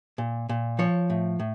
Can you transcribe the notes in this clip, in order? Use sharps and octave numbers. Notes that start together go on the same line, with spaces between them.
A#2
A#2
F3 C#5
A2
A2